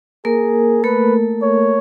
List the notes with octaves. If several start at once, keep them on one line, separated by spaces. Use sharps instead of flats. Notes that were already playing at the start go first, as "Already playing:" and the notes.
A#3 G#4 A#4
A3 A4 B4
C#5